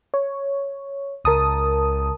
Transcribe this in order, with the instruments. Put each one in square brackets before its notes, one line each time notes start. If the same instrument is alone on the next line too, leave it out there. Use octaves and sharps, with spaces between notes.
[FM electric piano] C#5
[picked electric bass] C#2 [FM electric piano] A#4 A5 D#6